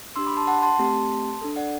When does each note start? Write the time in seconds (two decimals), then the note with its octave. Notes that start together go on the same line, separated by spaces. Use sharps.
0.16 D4 G4 C6 E6
0.27 B5 D6
0.37 A5 C6
0.47 F#5 A5
0.62 A5 C6
0.79 A3 C4 G4
1.41 D4 A4
1.56 D5 F#5